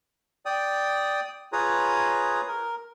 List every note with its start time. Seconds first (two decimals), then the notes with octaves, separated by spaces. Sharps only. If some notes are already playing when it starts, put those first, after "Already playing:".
0.46 D5 G5 D#6
1.53 F4 G#4 B4 C#5 A#5 D#6
2.48 A#4